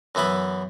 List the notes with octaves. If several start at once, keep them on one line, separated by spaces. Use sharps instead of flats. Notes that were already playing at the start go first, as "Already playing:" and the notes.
F#2 E3 B3 E4 B4